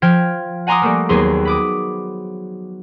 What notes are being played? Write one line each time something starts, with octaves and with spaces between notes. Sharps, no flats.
F3 G5 F6 G#6
F#5 G#5 A#5 C6 D6 D#6
G3 A3 A#3
D#2 F#3 B3 G#4 C6
B5 D6 D#6